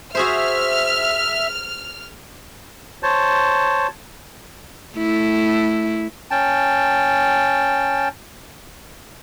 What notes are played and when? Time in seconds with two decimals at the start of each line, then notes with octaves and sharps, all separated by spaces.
0.15 F#4 G#4 C5 E5 F6
3.03 C5 C#5 A5
4.96 A3 E4
6.31 C#4 G5 A5